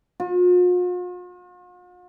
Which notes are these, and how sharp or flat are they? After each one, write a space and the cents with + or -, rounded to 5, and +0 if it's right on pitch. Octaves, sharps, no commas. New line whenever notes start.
F4 +45